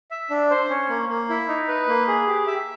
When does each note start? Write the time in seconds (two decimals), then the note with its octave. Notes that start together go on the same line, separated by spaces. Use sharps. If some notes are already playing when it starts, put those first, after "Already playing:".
0.11 E5
0.30 D4
0.50 C5
0.70 C#4
0.89 A#3
1.09 A#3
1.29 E4
1.48 D#4
1.68 B4
1.88 A#3
2.08 G#4
2.27 G4
2.47 E5